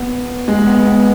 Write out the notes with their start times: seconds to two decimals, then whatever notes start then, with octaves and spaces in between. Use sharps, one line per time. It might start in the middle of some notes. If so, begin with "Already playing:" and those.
Already playing: B3
0.48 G#3
0.67 B3
0.87 B3